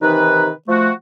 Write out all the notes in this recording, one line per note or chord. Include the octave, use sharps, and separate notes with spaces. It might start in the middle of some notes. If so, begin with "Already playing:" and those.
C3 D#3 E3 D#4 B4
F3 A3 F#4